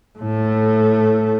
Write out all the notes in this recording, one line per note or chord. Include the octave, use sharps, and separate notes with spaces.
A2 A3